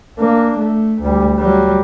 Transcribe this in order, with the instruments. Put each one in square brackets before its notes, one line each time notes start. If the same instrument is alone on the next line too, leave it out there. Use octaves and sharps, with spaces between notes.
[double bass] A#3 D4
A3
D2 G3
F#3 G3